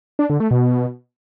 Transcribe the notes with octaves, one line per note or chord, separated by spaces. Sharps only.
D4
D3
A3
B2